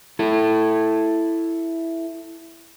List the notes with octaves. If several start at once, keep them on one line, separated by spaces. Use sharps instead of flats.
E4 A4